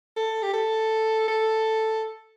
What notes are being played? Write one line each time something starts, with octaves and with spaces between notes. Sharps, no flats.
A4
G4
A4
A4